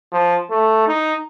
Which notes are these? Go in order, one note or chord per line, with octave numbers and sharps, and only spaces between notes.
F3
A3
D#4